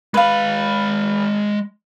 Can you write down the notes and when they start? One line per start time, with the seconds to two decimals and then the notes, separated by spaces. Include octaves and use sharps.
0.14 G#3 B4 F5 B5